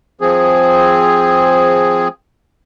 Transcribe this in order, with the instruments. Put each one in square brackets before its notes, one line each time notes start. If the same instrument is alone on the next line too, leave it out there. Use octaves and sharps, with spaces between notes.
[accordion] F3 C4 G#4